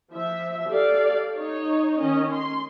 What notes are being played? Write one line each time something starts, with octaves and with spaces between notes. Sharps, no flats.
F3 E5
G4 A4 D5 F5
D#4 C#5
D#3 C#4 D#5
C6